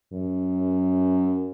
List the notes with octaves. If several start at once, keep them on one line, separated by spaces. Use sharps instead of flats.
F#2